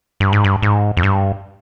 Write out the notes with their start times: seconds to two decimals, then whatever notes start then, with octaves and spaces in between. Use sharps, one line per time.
0.20 G2
0.33 G#2
0.44 G2
0.62 G#2
0.97 F2
1.03 G2